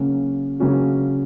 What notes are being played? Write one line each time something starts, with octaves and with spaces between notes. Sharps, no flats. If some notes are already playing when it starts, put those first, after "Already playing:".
Already playing: C#3 F#3 A#3 C#4 F#4
C#3 F#3 A#3 C#4 F#4